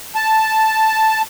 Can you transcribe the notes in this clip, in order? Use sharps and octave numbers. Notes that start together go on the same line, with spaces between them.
A5